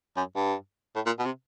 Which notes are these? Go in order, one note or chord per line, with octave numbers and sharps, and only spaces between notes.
F#2
G2
A2
A#2
B2
C3